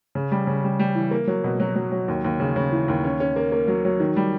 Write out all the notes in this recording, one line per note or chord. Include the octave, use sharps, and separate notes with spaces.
C#3
G3
C#3
G3
G3
E3
A#3
F#3
B2
F#3
F#3
F#3
D#2
D#2
C#3
C#3
E3
D#2
C#4
C#4
A#3
A#3
F#3
F#3
D#3
G3